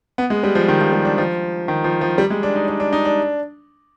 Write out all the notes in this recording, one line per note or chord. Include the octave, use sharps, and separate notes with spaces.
B3
G#3
G3
F3
D#3
F3
G3
D4
F3
D#3
F3
F3
G3
G#3
D4
D#4
D4
D4
D#4
D4